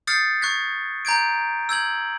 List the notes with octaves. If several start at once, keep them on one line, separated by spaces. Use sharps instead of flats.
D#6 F6 G6 A6 C7 C#7
C#6 F#6 G#6 B6
A#5 G6 G#6 D7
E6 G6 G#6 F#7